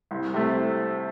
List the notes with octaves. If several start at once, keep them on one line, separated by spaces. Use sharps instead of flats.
C2
C3 A3